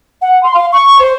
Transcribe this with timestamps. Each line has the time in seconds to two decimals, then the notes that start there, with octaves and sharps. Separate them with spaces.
0.21 F#5
0.43 C6
0.54 F5
0.72 C#6
0.99 C5